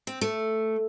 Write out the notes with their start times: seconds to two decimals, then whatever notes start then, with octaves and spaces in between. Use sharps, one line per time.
0.07 C4
0.21 A3